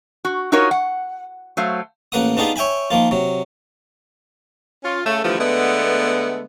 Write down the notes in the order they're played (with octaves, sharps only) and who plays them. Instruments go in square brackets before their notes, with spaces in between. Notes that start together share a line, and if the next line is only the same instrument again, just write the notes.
[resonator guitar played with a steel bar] F#4
D#4 F4 F#4 A#4 C#5 D#5
F#5
F#3 A3 C5 F5
[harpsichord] A1 A#3 B4 F#5 D#6
B3 D4 D#4 F4 G4 G#4
C#5 E5 G5 G#5 B5
D#3 F3 A#3 F4
C3 F#3
[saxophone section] C#4 F4
C#3 A3
D3 E3 F3 G3 A3
D3 G#3 A3 B3